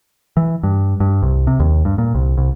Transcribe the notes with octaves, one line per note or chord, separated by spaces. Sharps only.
E3
G2
G2
C2
C3
D#2
G2
A#2
C2
C2